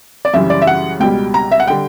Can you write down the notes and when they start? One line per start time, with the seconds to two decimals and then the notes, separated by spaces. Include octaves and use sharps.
0.25 D5
0.34 F#2 C#3 E3 G3 E5
0.50 D5
0.62 E5
0.67 F#5
1.00 C#2 B2 G3 G5
1.34 A#5
1.52 E5
1.60 F#5
1.67 D3 G3 G5